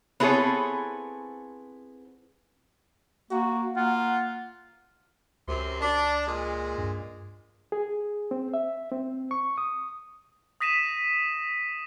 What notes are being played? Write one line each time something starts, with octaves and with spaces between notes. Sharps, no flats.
B3 C4 E4 G#4 A4 C#5
A#3 F#4
A#3 F4 F#5
C#2 F#2 C3 C6
D4
A#2 G#3
G2
G#4
C4
E5
C4
C#6
D#6
D#6 A#6 B6 D#7 E7